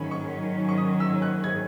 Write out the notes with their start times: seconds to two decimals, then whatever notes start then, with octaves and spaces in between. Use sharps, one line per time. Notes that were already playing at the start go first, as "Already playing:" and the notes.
Already playing: D#3 F#3 C#4 B5
0.11 C#6
0.69 C#6
0.77 D#6
1.00 E6
1.22 F#6
1.44 G#6